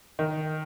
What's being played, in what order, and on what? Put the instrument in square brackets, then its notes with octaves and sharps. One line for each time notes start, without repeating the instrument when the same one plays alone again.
[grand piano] D#3